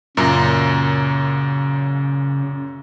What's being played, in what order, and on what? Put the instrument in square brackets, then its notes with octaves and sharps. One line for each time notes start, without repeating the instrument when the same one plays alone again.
[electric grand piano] F#2 A#2 A#5 [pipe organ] C#3